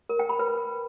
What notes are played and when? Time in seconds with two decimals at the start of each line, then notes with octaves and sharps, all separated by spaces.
0.09 A#4
0.19 G5
0.29 B5
0.39 B4